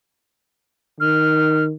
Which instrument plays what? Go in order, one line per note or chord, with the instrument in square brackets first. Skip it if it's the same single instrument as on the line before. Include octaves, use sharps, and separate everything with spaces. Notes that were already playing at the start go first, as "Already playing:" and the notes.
[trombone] D#3 [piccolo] F6